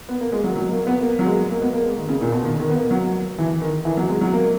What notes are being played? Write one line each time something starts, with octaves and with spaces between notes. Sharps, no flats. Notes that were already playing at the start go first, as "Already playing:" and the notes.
B3
A#3
G#3
F#3
F#3
A#3
B3
A#3
F#3
G#3
A#3
B3
A#3
G#3
D#3
C#3
A#2
B2
D#3
D#3
B3
A#3
F#3
E3
D#3
E3
F#3
G#3
F#3
A#3